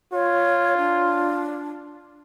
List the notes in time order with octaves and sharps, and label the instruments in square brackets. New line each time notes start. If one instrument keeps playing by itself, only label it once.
[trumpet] F4 [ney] C#5
[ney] D4